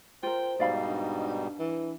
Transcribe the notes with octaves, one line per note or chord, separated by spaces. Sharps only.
F4 A#4 C5 G5
G#2 B2 G3 D#4 D5 F5 B5
D4
E3